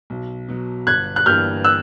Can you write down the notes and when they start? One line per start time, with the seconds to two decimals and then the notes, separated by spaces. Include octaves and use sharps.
0.10 B1
0.49 B2 F#3
0.87 G1 F#6 G#6
1.16 F#6
1.26 G2 E3 G3 A#3 F6 G6
1.64 E6 F#6